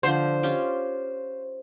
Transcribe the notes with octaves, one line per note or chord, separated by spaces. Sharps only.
D3 F3 C5
C#4 F4 G4